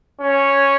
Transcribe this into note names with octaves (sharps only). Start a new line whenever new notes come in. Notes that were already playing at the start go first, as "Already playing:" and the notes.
C#4